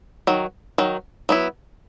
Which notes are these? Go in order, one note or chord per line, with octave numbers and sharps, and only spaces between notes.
D#3 F#3
D#3 F#3
F#3 B3 E4